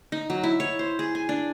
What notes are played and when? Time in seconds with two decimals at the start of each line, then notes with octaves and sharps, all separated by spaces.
0.12 D#4
0.30 F#3
0.43 E4
0.60 C#5
0.79 C5
0.99 G#4
1.15 G#5
1.29 D4